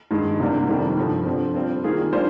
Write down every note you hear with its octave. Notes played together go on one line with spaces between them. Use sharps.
G2 D#3 G#3
C2 C3 G3 A#3 D4
F2 C3 D#3 G3 C4
G2 D3 F3
D3 F3 C4
G3 C4 F4
D#3 A#3 F4 G#4
D#3 G3 D4 F4 C5